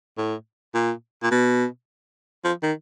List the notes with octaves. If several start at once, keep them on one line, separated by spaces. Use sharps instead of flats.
A2
A#2
A#2
B2
F3
D#3